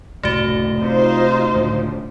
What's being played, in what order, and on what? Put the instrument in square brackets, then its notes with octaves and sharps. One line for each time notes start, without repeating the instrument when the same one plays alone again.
[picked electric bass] F#1 C2 A2 [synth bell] A3 F#4
[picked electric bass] C3 [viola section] D#4 F4 C5
[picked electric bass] C#2 A2 D3